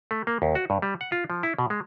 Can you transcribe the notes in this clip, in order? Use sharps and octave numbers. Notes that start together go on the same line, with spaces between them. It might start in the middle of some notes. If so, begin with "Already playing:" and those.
A3
A#3
D#2
F#4
G2
G3
F#5
F4
F3
E4
B2
G#3